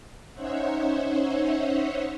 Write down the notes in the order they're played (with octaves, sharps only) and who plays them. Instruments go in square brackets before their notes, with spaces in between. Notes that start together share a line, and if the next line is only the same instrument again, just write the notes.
[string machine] C#4 D#4 C5 C#5 E5 F#5